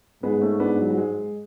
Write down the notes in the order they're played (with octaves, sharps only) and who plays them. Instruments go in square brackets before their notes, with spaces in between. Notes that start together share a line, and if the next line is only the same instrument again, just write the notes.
[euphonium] G#2 [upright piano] G#3 B3
[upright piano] A3 C#4
B3 D4
F#3
F#3
G#3